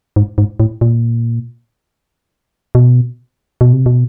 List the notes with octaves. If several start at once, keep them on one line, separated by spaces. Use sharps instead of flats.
G#2
G#2
A2
A#2
B2
B2
C3
B2